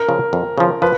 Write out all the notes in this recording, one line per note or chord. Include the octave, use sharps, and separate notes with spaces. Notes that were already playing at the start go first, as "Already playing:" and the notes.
Already playing: A#4
C#3 F3
F2
C#3 F3
F3 B4